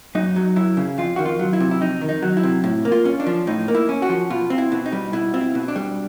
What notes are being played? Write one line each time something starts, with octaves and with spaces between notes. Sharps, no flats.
F#2 D#4
F#3
F#2 E4
C#3
F2 F4
D#3 F#4
F4
F#3
E4
C3
E4
F2 D#4
D#3
D#4
F#3
E4
C3
A2 E4
A#3
F4
C#4
D4
F3
A2 D#4
A#3
E4
C#4
F#4
F3
B2 F4
C4
E4
B2
D#4
G3
B2 E4
C4 F4
E4
B2
D4
G3